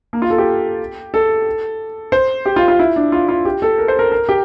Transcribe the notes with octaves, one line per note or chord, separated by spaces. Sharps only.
A#3
F4
A4
G4
A4
C5
G4
F4
F4
E4
D4
F4
F4
G4
A4
A#4
C5
A#4
A#4
G4